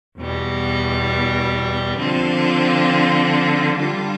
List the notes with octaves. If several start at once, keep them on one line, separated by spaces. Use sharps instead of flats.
E2 B2 G3
D3 F3 C4 F4
D3 G3 D4 F4